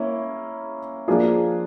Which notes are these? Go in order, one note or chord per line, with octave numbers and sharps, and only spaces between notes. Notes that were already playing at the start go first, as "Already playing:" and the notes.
Already playing: A#3 C#4 E4
F3 A#3 D4 F4 G#4